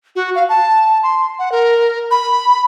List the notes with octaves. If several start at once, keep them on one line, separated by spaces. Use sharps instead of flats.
F#4
F5
A5
C6
F#5
A#4
B5